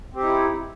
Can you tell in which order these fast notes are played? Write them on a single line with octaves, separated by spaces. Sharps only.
C4 G4 D#4 E4